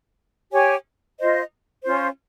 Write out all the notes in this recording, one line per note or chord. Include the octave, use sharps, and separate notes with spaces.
G4 C#5 G#5
F4 C5 D#5
C#4 F4 C5